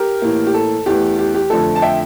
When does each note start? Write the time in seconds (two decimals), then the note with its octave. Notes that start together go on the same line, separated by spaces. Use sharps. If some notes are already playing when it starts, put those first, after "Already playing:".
Already playing: G4 A#4
0.22 A2 E3 A#3
0.47 G4
0.54 A4
0.86 E2 E3 A3 G4
1.19 G4
1.34 G4
1.50 F2 D3 F3 A3 A4
1.76 A5
1.82 E5 G5